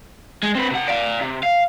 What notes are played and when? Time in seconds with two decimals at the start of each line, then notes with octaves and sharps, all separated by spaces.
0.43 G#3
0.55 C4 B4
0.71 C3 F#5
0.88 D5 F5
1.21 C3
1.43 F5